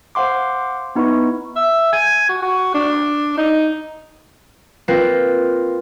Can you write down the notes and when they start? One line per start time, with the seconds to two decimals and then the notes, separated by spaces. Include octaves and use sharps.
0.15 C5 F5 F#5 C6 D6
0.95 B3 D#4 E4 B4 C#6
1.56 E5
1.93 G#5
2.29 F#4
2.42 F#4
2.74 D4
3.38 D#4
4.88 A#3 C4 F4 B4